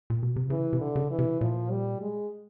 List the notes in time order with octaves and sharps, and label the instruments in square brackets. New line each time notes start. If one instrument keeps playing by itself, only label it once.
[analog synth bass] A#2
B2
C3
[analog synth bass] C#3 [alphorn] E3
[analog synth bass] C3
[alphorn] D3
[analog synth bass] C#3
[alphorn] E3
[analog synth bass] C3
[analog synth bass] A#2 [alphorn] F3
[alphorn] G3
G#3